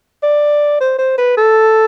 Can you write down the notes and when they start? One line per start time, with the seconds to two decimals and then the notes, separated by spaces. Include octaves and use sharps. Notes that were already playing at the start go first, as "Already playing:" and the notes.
0.23 D5
0.81 C5
0.99 C5
1.18 B4
1.37 A4